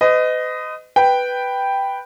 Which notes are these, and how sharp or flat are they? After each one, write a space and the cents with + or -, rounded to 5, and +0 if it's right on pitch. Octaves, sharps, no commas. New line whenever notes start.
B4 +45 D#5 +0
B4 +0 G5 +0